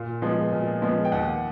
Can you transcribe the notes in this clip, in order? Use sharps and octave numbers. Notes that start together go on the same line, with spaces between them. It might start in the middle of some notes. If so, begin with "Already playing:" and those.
Already playing: A#2 F5
F3 G#3 B3
A#2
F3 G#3 B3
G5
D#2 F#5